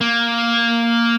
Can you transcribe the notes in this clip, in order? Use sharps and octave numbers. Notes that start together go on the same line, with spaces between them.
A#3